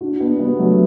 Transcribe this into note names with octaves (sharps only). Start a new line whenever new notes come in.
D4 F#4
B3 D4
G3 B3
F#3 A3